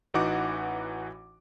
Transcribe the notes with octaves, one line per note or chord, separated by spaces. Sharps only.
A1 E3 D#4 F#4 F#5 D6